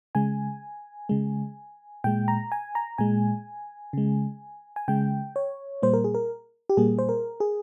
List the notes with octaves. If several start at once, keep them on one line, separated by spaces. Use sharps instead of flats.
C#3 G#3 G#5
C#3 G#3
A#2 G#3 G5
A#5
G#5
A#5
A#2 G#3 G#5
C#3 G#3
G#5
C#3 G#3 G5
C#5
A#2 G3 A#3 C5
A#4
G#4
A#4
G4
A#2 G3 A#3 G#4
C5
A#4
G#4